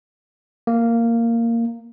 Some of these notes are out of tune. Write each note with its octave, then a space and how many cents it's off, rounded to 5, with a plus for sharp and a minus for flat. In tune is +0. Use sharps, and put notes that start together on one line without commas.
A#3 -10